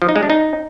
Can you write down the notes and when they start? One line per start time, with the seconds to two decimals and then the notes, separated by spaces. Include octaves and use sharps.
0.02 F3
0.09 D#4
0.16 G#3
0.23 D4
0.30 D#4